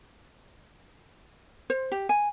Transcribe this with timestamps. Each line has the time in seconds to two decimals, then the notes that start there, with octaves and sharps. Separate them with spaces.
1.70 C5
1.92 G4
2.09 G#5